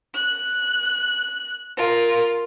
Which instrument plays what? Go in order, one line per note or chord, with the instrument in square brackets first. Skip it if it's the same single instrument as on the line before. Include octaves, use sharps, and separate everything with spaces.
[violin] F#6
F4 A#4